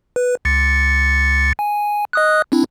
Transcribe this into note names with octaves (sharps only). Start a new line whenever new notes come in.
B4
C#2 A6 C#7
G#5
D#5 D#6 F#6
C4 D4 E4